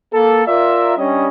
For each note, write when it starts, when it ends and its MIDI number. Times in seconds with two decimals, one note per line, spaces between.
0.13 0.46 58
0.13 0.46 69
0.47 0.94 65
0.47 0.94 70
0.47 0.94 74
0.47 0.94 76
0.98 1.27 55
0.98 1.27 61
0.98 1.27 62
0.98 1.27 75